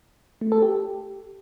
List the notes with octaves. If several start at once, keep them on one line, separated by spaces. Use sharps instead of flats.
A3
A4
G4